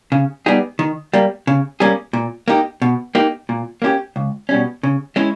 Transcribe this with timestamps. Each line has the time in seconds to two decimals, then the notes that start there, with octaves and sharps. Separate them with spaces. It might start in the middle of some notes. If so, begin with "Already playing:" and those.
0.12 C#3
0.46 G3 B3 D#4 G#4
0.79 D#3
1.13 G3 A#3
1.47 C#3
1.80 G3 A#3 C#4 G#4
2.13 A#2
2.48 A#3 D#4 G4
2.82 B2
3.15 A#3 D#4 G4
3.49 A#2
3.82 A#3 C#4 E4 G4
4.16 C#2
4.49 B2 G3 C#4
4.83 C#3
5.16 G#3 C#4 E4